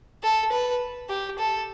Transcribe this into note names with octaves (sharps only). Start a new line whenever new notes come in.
A4
B4
G4
A4